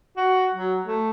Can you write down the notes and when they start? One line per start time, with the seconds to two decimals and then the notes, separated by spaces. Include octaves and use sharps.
0.17 F#4
0.54 F#3
0.85 A3